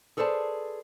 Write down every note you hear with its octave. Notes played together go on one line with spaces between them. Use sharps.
G#4 A4 B4 C5 D5 A5